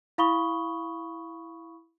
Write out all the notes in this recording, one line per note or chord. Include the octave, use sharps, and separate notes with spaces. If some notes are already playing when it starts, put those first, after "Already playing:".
E4 F5 B5 C#6 D#6 G7